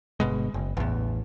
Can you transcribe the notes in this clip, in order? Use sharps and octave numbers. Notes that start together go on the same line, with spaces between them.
G1 B2 G#3
F#1
A1 E2